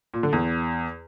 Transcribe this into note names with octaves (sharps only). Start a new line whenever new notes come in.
A#2
D3
E2